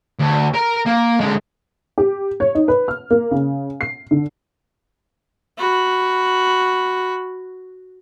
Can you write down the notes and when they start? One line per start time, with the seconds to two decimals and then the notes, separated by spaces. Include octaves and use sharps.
0.19 D2
0.54 A#4 A#5
0.86 A#3
1.20 D3 G#3
1.98 G4
2.40 C#5
2.55 D#4
2.68 B4
2.88 F6
3.11 A#3
3.31 C#3
3.81 C7
4.11 D3
5.58 F#4 B5